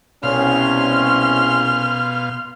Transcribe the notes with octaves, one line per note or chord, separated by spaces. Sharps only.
C2 B2 C#4 F5 C6 F6